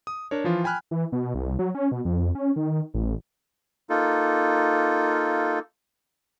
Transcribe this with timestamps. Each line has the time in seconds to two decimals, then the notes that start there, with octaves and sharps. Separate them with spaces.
0.07 D#6
0.31 D4 A#4 C#5
0.44 E3 F3 F4
0.64 G5 G#5 B5 F6 F#6
0.91 E3
1.12 B2
1.34 C2
1.59 F#3
1.75 C#4
1.92 B2
2.05 F2
2.35 C#4
2.56 D#3
2.94 A1
3.90 A#3 D#4 F4 A4